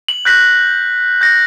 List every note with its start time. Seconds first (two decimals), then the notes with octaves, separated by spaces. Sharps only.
0.08 F#7
0.25 F#6 G6 A#6 B6 F#7
1.21 G6 A#6